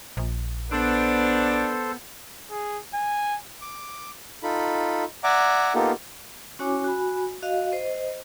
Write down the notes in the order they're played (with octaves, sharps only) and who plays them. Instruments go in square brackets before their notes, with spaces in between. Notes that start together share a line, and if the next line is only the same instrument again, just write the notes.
[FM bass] A#1
[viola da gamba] B3 [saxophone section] D4 [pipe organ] A4 C5
[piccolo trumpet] G#4
G#5
[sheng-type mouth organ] D6
D#4 F4 A4 B5
D5 E5 F#5 G#5 A#5 D6
A#3 B3 D#4 F4 G4 A4
[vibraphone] C#4 E4 F#4 C#5 G#5 D6
F#4 G#5 B5
F#4 D#5 F5
C5 D#5